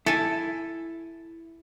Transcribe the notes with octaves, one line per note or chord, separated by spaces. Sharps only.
E4 A4 G#5